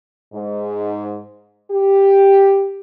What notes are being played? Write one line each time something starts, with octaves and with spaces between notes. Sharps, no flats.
G#2
G4